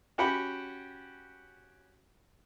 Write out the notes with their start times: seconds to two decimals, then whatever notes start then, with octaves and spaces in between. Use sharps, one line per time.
0.18 C#4 F#4 G4 F#5 G5 B5